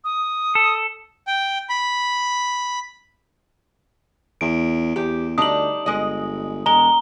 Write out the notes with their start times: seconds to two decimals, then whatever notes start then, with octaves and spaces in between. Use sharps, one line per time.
0.04 D#6
0.55 A4
1.27 G5
1.69 B5
4.41 E2 D7
4.96 E2 G4
5.38 D2 G3 D4 D#4 D#6 F#7
5.86 G1 G#3 D#5
6.66 E1 G#3 A#5 G7